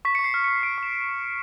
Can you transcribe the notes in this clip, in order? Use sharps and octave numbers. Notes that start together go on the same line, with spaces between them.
C#6 B6
C#7
C#6
C7
F6
F6 C#7
C#6 D7
C#6 E7